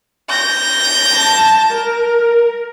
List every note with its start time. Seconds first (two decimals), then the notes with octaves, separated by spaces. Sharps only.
0.30 G6 A#6
1.13 A5
1.73 A#4